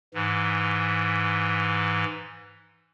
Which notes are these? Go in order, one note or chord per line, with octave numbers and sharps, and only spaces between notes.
G#2 E3